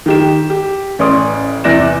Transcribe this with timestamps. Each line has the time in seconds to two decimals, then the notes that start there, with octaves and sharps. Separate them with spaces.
0.06 D#3 G4 E7
0.50 G4
0.99 A1 C#4 C#5 D5 C6 D#6
1.64 E2 C3 D5 F#6 A#6 E7